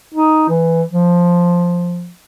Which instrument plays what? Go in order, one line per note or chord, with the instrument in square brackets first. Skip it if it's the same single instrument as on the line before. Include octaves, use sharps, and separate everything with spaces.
[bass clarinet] D#4
E3
F3